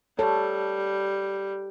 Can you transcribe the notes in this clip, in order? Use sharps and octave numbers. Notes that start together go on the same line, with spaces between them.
G3 A4 C#5